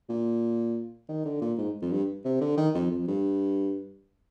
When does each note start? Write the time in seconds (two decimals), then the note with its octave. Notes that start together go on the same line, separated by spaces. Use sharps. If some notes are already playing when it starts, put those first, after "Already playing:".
0.09 A#2
1.09 D#3
1.25 D3
1.41 A#2
1.58 G#2
1.82 F2
1.91 G2
2.25 C3
2.41 D3
2.57 D#3
2.75 F2
2.91 F2
3.07 G2